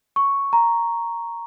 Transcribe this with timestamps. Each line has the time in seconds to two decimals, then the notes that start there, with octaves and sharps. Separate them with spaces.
0.16 C#6
0.53 A#5